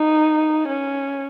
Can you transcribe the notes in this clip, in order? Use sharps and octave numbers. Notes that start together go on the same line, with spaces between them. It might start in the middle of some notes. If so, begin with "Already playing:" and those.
Already playing: D#4
C#4